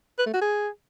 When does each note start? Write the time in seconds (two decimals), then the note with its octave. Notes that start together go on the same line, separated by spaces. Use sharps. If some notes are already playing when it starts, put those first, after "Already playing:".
0.19 B4
0.26 A3
0.34 F#4
0.41 G#4